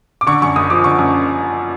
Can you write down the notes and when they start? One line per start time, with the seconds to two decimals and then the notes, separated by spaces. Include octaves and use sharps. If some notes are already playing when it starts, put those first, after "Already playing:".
0.21 D6
0.27 D3 C#6
0.42 F#2 C#6
0.56 F#1 D#6
0.70 F3 D6
0.84 D3 C#6
0.99 F#2